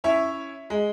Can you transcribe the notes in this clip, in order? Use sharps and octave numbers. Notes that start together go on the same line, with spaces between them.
C#4 E4 C#5 E5
G#3